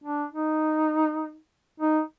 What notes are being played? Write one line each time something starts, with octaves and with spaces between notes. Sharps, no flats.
D4
D#4
D#4